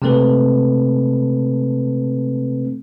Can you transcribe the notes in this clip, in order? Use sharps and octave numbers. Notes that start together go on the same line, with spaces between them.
C3 G#3 A3 C4 A4 B4